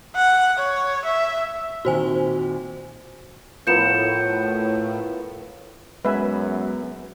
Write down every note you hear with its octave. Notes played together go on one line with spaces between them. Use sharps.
F#5
C#5
E5
A#2 D#3 C4 F#4 C5 G#5
A2 F3 B3 A#4 G6 C#7 E7
F#2 G#3 B3 B4 E5 G#5